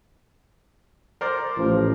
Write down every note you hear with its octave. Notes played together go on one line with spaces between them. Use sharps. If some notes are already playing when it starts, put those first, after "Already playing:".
A#4 C5 D5
A1 F3